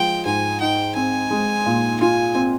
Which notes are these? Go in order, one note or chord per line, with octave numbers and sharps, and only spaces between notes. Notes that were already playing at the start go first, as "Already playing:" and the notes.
Already playing: F3 G#3 G5
G#2 G#5
D#4 G5
C4 G#5
G#3
A#2
F4 G#5
C4